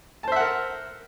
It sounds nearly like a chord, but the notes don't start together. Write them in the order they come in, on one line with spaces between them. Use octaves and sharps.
A5 C5 E5 F#5 A#4